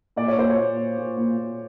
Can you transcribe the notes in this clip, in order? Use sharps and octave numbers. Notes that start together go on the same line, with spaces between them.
A#2 D5
C#5
A#2 C5
C#5
A#2
A#2
A#2
A#2
A#2